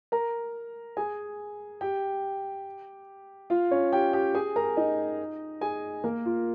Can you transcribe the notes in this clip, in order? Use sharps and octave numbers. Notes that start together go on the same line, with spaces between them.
A#4 A#5
G#4 G#5
G4 G5
F4 F5
C#4 C#5
G4 G5
G4 G5
G#4 G#5
A#4 A#5
D#4 D#5
G#4 G#5
A#3 A#4
F4